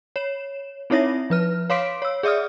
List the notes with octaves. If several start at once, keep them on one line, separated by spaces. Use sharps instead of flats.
C#5 E7
C4 D#4 E4 C#5 E5 A#6
F3 B4 F6
C#5 F5 C6 D6 B6 D7
C#5 E6
G#4 D5 E5 D#6 F6